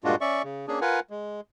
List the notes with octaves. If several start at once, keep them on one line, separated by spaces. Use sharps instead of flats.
G2 A#2 G#3 D4 F4 F#4
C#4 D5 E5 C#6
C#3
A#3 C#4 D4 G#4
F4 A#4 B4 F#5 G#5
G#3